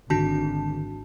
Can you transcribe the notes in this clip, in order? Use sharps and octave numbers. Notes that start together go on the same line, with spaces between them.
G#1 D3 D#3 D4 F#4 A5